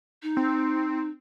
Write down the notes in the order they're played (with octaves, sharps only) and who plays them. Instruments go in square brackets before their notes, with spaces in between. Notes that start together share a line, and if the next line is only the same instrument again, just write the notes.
[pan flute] D#4
[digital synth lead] C4